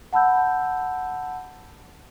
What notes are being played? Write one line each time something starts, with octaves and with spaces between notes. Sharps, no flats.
F#5 A5 B5 E6 G6